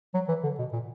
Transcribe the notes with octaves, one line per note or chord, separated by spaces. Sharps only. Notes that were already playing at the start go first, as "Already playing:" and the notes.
F#3
E3
D3
B2
A#2